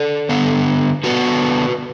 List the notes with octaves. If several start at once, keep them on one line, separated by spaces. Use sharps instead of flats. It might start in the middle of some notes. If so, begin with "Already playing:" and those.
Already playing: A4 D5
D3 B3 D4
D3 B3 D4 F#4 B4